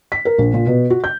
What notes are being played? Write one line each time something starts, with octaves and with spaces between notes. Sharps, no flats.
B6
A#4
A#1
A#2
B2
F#4
G6